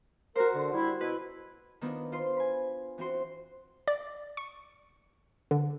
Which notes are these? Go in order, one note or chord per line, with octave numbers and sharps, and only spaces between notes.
F#4 A#4 C5
D3
G3 E4
B2 E4 B4
D#3 B3 D4 F4
F4 C5 C6
G#5 B5
E3 C4 F#4 C6
D5
C#6
D3